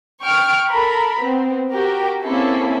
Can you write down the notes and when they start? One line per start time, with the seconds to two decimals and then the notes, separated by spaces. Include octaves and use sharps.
0.21 G5 C#6 F6 D7
0.69 A4 A#4 A#5 B5
1.20 B3 C4
1.72 F#4 G4 A#4 G5
2.22 A#3 C4 C#4 E4 G#4 A4